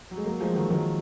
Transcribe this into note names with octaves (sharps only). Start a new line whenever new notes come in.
F#3
G#3
F#3 A#3
F3 G#3
D#3 F#3
G#3
D#3 F#3